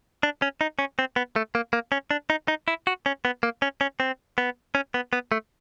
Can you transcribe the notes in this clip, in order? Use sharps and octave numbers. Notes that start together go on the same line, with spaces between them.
D4
C#4
D#4
C#4
C4
B3
A3
A#3
A#3
C#4
D4
D#4
D#4
E4
F#4
C#4
B3
A#3
C#4
C#4
C4
B3
C#4
B3
B3
A3